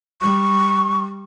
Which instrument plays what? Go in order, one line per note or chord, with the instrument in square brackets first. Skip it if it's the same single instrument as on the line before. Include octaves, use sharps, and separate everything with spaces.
[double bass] G3 [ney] C#6